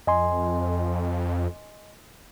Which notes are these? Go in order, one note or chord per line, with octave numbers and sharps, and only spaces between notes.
F2 D#5 G#5 C6